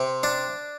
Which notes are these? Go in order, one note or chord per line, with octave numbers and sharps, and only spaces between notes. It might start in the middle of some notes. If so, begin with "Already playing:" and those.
Already playing: C3
D4